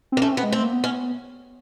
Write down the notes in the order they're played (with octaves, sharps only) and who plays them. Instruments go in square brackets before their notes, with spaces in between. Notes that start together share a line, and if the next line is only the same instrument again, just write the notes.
[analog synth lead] C4
[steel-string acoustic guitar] A#3
[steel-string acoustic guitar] A3 [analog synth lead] C#4
[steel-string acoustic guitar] B3 [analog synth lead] C4
[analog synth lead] G#3
[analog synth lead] A3 [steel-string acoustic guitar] C4
[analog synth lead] A#3
B3
[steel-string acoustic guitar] C#4